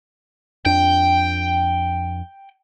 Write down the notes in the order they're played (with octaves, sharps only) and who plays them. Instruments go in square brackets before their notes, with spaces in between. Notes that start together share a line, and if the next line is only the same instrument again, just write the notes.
[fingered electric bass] F2 D4 [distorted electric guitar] G5